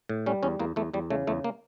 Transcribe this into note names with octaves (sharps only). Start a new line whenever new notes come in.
A2
G3 C#4
E2 C#4
E2 A#3
E2 A3
E2 G3
C#3 A3
E2 A3
A#3